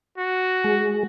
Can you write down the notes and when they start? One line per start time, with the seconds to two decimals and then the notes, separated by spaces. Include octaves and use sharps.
0.18 F#4
0.64 G#3